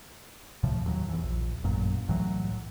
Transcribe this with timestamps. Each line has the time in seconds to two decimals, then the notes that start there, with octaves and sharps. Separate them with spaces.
0.63 C#2 A2 C3 F3
0.86 D#2 F#3
1.09 E2 E3
1.23 A#1
1.64 A1 F#2 A#2 F#3
2.08 C2 A2 E3 F#3